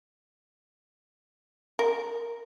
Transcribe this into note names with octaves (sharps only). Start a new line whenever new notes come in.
A#4